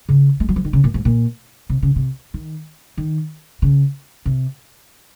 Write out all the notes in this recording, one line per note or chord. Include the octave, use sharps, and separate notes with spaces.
C#3
G#3
F#3
F3
D#3
C#3
A#2
G#2
A#2
C3
C#3
C3
D#3
D#3
C#3
C3